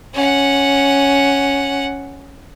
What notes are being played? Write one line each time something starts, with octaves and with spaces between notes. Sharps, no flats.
C#4 F#5